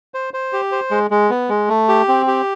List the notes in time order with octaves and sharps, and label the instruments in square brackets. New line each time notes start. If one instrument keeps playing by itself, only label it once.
[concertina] C5
C5
G4
C5
G#3
G#3
B3
G#3
A3
G4
C4
G4